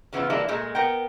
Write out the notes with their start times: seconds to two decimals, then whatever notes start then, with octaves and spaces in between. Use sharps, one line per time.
0.13 C#3 E3 B3 D#4 F4
0.30 E3 G3 G#3 A#3 D4 E4
0.49 A#2 G#3 A3
0.75 B3 A#4 G5